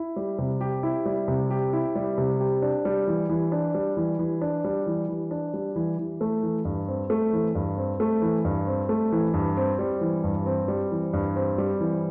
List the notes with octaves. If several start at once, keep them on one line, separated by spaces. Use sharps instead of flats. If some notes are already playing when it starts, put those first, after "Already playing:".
Already playing: E4
G3
C3
G4
E4
G3
C3
G4
E4
G3
C3
G4
D4
G3
E3
E3
D4
G3
E3
E3
D4
G3
E3
E3
D4
G3
E3
E3
A3
E3
G2
C4
A3
E3
G2
C4
A3
E3
G2
C4
A3
E3
G2
C4
G3
E3
G2
C4
G3
E3
G2
C4
G3
E3